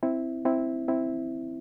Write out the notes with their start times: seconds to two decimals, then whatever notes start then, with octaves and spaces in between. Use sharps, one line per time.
0.03 C4 E4
0.45 C4 E4
0.88 C4 E4